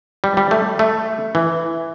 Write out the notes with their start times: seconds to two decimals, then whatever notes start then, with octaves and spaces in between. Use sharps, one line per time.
0.24 G3
0.37 G3
0.51 A3
0.79 A3
1.35 E3